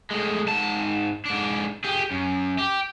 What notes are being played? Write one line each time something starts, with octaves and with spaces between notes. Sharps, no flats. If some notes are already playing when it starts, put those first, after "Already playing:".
A2 G#3
G#2 A5
G#2 D4
G4 G#4
F#2
G4